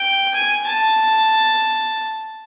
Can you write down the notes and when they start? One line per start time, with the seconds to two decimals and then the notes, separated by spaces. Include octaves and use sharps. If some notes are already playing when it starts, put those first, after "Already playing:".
Already playing: G5
0.34 G#5
0.66 A5